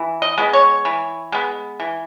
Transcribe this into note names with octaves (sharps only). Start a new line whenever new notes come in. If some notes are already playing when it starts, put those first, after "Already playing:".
Already playing: E3
D#5
G#3 B3
C#5
E3
G#3 B3
E3